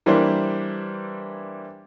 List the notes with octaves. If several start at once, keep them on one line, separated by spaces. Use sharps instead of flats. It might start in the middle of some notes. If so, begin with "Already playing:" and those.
E3 G3 A#3 D4 E4 C5